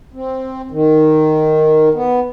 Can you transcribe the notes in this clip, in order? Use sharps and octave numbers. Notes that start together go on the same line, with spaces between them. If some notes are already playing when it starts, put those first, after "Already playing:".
C4
D#3
B3